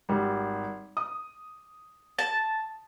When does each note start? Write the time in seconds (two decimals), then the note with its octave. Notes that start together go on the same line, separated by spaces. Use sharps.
0.09 G#1 G3
0.97 D#6
2.19 A5